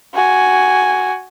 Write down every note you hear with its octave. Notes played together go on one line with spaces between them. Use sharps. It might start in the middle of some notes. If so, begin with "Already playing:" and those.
F#4 G#5